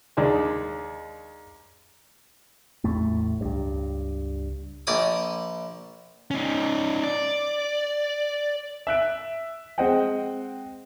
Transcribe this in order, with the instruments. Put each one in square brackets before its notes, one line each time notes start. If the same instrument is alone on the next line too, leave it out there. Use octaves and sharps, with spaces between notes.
[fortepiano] D#2 G#3 D4
[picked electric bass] A1 E2 A2 A3
C#2 G2
[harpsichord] A#1 D5 D#6
[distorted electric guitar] C#4 D#4
D5
[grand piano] E5 F#6 D7
G#3 C4 C5 D#5 F#5 G5